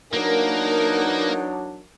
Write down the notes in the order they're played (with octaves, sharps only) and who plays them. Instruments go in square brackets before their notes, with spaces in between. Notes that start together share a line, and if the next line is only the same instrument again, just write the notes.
[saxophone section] E3 B3 D#4 [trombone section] F#3 D4 [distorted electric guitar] A#3 [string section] A#4